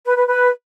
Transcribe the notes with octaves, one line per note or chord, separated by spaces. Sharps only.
B4
B4
B4